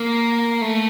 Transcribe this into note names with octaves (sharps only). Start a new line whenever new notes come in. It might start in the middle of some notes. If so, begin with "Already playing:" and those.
Already playing: A#3
A3